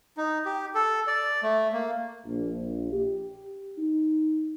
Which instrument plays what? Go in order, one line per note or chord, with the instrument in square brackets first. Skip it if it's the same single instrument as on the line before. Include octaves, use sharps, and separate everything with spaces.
[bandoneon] D#4
G4
A4
D5
A3
A#3
[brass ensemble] A#1
G4
D#4